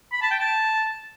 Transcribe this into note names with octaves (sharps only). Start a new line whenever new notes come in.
B5
A5
G5
A5